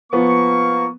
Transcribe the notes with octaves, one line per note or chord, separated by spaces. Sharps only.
F3 A#3 B3 C#6